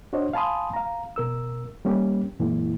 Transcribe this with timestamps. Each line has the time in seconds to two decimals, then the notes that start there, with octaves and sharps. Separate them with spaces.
0.13 D4 F#4 C5 C#5 D#5
0.33 F5 G#5 A5 B5 C6 D#6
0.74 F5 A#5
1.16 B2 A#4 E6
1.85 G3 A#3 C#4 G4
2.39 F#2 A#2 E3 G#3 A#3 E4